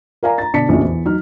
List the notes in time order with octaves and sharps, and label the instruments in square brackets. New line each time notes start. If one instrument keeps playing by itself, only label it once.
[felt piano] A#4 D5 F5 G#5 A#5
A#5 A6
B2 D3 D5 A5 B6 C#7
A#1 F2 C#3 E4 F#4
E2
F#3 D#4 F6